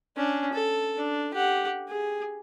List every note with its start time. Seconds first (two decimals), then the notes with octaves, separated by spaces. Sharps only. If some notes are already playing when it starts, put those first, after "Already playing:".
0.16 C#4 D4
0.53 A4
0.98 D4
1.34 G4 F#5
1.88 G#4